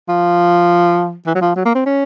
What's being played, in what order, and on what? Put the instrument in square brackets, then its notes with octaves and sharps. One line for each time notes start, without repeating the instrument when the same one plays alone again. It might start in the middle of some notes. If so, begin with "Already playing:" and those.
[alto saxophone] F3
E3
F#3
F3
F#3
A#3
C4
C#4